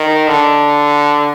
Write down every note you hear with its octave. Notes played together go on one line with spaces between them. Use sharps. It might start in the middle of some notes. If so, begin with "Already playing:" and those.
Already playing: D#3
D3